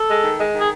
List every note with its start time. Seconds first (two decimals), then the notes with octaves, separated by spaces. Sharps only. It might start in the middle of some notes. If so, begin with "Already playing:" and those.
Already playing: A4
0.08 G#3
0.24 D#3
0.39 G#3
0.54 D#3
0.60 G#4